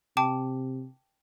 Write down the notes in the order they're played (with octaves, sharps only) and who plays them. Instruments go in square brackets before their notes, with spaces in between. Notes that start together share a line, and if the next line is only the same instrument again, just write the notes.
[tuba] C3 [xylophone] G5 A5 D6